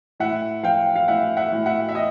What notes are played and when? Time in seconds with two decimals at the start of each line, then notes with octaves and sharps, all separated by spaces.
0.20 A2 E5 F#5
0.63 F3 F5 G5
0.96 F5
1.08 A2 E5 F#5
1.37 E5 F#5
1.52 A2
1.66 E5 F#5
1.89 E5
1.95 D#5